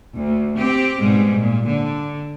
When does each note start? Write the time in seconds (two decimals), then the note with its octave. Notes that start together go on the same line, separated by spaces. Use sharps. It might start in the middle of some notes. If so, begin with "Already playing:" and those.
0.14 D2
0.57 C4 G4
0.99 G#2 B2 G3 G#3
1.37 A#2
1.66 D3